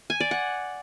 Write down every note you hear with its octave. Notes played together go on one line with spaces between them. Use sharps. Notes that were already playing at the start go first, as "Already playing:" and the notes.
G#5
D5
F#5